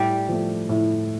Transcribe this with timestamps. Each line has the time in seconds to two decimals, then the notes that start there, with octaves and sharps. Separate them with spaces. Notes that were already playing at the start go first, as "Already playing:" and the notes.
Already playing: A2 G3 G4
0.29 F3 A3
0.69 A2